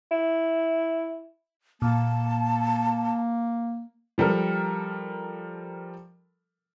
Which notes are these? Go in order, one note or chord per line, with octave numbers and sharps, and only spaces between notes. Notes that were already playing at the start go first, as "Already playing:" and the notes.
E4
A#2 A#3 A5
F3 G3 A4 A#4